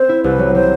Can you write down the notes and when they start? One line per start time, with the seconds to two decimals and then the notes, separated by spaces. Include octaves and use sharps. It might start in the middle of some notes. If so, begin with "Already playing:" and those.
Already playing: C4 C5
0.09 E4
0.24 C2 B4
0.39 F#3
0.54 F#3 C5